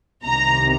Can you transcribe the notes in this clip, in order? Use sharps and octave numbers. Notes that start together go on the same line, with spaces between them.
C2 C3 D#3 A#5